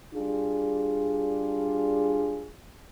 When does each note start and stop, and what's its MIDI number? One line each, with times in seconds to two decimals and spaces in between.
0.15 2.50 55
0.15 2.50 62
0.15 2.50 65
0.15 2.50 68